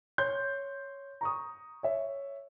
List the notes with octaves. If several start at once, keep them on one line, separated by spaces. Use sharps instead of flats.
C#5 C6 G6
A#5 C#6 D#6
C#5 E5